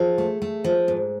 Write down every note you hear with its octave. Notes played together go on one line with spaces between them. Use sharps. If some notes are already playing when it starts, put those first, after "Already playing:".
Already playing: F3 G#4
A3
A3
F3
G#2